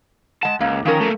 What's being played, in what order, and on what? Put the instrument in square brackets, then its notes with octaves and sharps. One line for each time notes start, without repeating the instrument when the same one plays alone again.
[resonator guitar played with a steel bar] G#3 F#5 [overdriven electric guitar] A5
[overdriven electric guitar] C#2 [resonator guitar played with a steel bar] A#3
[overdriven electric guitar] D#3 [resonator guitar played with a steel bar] F3 C#4 A#4
[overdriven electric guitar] A3 A#3